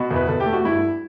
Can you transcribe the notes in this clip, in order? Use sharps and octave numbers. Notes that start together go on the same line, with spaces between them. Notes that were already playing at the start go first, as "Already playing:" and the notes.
Already playing: B2 F#4
E2
B4
E2 A4
G4
A3
F#4
G2 E4